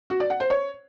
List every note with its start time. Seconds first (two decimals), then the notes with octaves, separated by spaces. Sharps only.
0.10 F#4
0.20 D5
0.30 F#5
0.40 C5
0.50 C#5